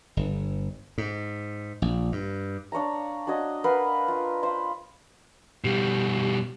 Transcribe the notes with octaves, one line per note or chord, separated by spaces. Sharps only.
G1
G#2
A#1
G2
D4 C#5 F5 A#5
D4 F#4 C#5 D#5
A#4 B4 F5 F#5
F4
C5 F5 B5
B2 G3 G4